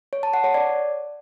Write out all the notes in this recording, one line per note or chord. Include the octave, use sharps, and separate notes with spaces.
C#5
A5
F#5
C#5
D5